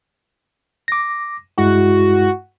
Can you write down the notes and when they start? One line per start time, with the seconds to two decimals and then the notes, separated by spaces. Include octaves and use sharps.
0.88 D6 A#6
1.58 G2 G#3 E4 F#4